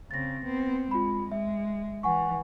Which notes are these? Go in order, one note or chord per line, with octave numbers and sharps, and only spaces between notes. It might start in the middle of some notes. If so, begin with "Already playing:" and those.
C#3 C4 A6 A#6
B3 C4
G#3 F4 B5
G#3 E5
E3 F#5 G#5 C#6